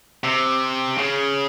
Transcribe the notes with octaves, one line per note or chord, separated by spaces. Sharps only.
C3
C#3